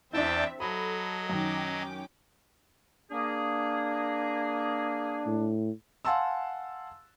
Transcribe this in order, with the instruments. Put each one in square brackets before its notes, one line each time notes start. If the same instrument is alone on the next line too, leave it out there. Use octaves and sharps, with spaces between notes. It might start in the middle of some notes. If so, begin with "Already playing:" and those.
[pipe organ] E2 G5 A5 [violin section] C4 E5 [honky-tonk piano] D4 E4
[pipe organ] F#3 D#5 [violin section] A4 [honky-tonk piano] B5
[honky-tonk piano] F#2 D#3 [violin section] C#4 G5 D6
[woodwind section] A#3 G#4 [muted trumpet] D4
[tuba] A2
[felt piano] F5 F#5 G#5 A5 C6 E6